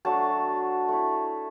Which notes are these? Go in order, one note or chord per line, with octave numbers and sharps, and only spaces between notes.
F#3 A3 D4 A5
A3 E4